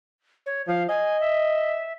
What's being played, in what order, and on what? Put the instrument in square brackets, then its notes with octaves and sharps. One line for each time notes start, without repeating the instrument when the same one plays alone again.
[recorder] C#5
[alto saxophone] F3 [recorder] F5
[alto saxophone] D#5 [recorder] G#5
[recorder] E5